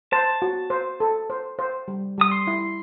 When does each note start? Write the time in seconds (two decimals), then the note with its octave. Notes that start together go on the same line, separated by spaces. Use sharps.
0.12 C5 A5
0.42 F#4
0.70 C5
1.00 A4
1.30 C5
1.59 C5
1.88 G3
2.18 G3 D#6
2.32 C6
2.47 E4